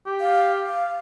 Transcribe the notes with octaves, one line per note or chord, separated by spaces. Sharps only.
G4
F5
F5